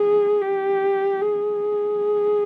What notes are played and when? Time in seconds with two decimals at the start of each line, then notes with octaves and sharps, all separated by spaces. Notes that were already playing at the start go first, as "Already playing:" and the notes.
Already playing: G#4
0.41 G4
1.21 G#4